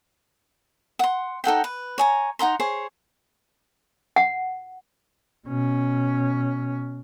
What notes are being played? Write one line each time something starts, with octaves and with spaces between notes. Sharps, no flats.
F#5 C6
D#4 A4 F#5 G5
B4
C#5 G#5 A#5
D#4 F#5 A#5 C6
G#4 C5 C#5
F#5
B2 C#4